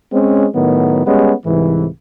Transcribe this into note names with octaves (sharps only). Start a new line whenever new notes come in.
G#3 C4 C#4
A2 D#3 F#3 B3
G3 G#3 B3 C#4
C2 G#2 E3